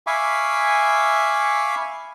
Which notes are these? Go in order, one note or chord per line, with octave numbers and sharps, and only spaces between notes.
E5 F5 G#5 B5 C#6 D6